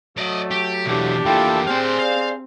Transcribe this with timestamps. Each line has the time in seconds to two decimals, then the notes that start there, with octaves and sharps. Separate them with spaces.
0.18 F#3 A3 D5 D#5
0.51 G4
0.86 B2 E3 D4 G4
1.25 E2 A#3 E4 F4 A4 G5
1.67 C4 G#4 C5 D5 F5
1.99 D5 F5